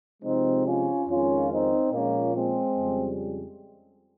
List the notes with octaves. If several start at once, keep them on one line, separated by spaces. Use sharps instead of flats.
C3 F3 G#3 C4 D#4
C#4 F4
F2 D#3 G#3 C#4 F4
C4 D#4
A#2 F3 G#3 A#3 C#4
G#3 C4
F2 C#3 G3